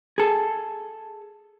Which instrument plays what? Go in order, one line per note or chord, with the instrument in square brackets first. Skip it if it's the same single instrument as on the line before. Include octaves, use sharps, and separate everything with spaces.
[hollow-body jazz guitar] G#4 A4